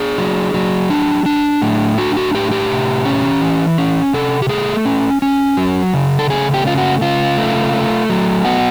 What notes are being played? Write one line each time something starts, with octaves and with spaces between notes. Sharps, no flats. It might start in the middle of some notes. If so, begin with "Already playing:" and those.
Already playing: D4 G#4
F#3
F#3
D4
D4
A2
D4 F#4
F#4
A2 G4
G4
C3
C#4
E3
C#4
C3 A4
G4
A3 G#4
C#4
C#4
F#3
C#3
A4
A3 G#4
G4
C#3 F4
F#4
C#3 F4
A3
A3
F#3
B3 F#4